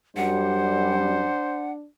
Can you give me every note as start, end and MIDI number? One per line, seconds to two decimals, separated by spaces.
0.17 1.31 42
0.17 1.31 55
0.17 1.87 62
0.17 1.70 72
0.17 1.72 78